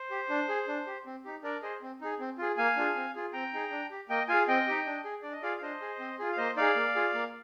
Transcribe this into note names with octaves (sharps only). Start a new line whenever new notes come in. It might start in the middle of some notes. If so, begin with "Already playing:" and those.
Already playing: C5
G4
D4
G#4
D4
G4
C4
D#4 G4
D4 A#4 D5
G#4 C5 D#5
C4
D#4 G#4
C4
F4 G#4
A#3 F5 G#5
D4 F4 G#4
C4
F4 G#4
C4 G5 A#5
D#4 G#4
D4
G4
A#3 D#5 G5
F4 G#4 F5 G#5
C4 D#5 G5
D#4 G4
D4
G#4
D4 D5
D#5
F4 G#4 D5 F5
F5
D4 C5 D#5
G#4
C4
F4 G#4
F5
A#3 C5 D#5
D#4 G#4 D5 F5
A#3
F4 G#4
A#3